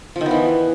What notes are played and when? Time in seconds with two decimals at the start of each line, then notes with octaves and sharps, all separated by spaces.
0.16 F3
0.21 D#3
0.26 B3
0.31 E3